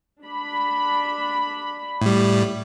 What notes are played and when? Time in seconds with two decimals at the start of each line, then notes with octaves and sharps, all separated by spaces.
0.23 D4 B5
2.01 A2 G3